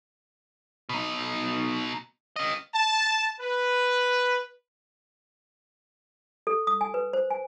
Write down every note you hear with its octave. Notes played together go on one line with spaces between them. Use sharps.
B2 D#4
C#4 D#5
A5
B4
A4
D#6
G#5
B4
C5
G#5